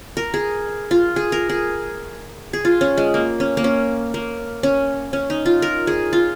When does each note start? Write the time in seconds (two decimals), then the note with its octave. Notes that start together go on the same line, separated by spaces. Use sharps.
0.17 A#4
0.34 G#4
0.91 F4
1.16 G#4
1.32 A#4
1.49 G#4
2.53 G#4
2.65 F4
2.81 C#4
2.98 G#3
3.14 A#3
3.40 C#4
3.57 A#3
3.64 C#4
4.14 A#3
4.63 C#4
5.13 C#4
5.30 D#4
5.46 F4
5.62 A#4
5.87 G#4
6.13 F4